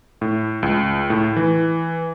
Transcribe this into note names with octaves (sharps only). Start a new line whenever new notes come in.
A2
C#2
A2
E3